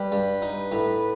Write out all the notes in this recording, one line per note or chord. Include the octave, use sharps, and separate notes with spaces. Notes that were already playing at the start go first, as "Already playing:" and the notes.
Already playing: G3 B4
G2
D#4
A2